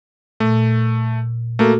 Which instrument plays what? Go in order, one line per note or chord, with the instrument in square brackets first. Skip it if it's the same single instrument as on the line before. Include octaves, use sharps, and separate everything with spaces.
[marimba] A#2 [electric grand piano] A3
[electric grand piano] A3 A#3 [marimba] F#4 A4